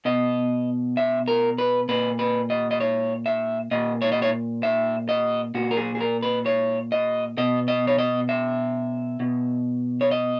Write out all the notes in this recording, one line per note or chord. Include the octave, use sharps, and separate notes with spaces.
B2 D#5
E5
A#4
B4
A#2 B4
B4
D#5
D#5
C#5
E5
A#2 D#5
C#5
D#5
C#5
E5
D#5
A#2 F#4
A#4
G#4
G#4
A#4
B4
C#5
D#5
B2 D#5
D#5
C#5
D#5
E5
B2
C#5
D#5